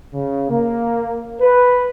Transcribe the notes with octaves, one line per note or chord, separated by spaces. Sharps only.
C#3
A#3
B4